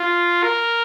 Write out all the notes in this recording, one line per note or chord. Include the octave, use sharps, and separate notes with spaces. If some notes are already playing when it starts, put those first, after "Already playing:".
Already playing: F4
A#4